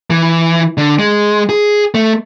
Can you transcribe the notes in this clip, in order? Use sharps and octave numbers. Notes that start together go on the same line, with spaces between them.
E3
D3
G#3
G#4
A3